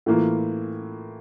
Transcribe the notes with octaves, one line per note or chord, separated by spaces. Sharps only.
A2 E3 A#3 F4